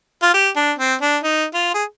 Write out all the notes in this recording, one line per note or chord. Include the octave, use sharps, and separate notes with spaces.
F4
G4
D4
C4
D4
D#4
F4
G#4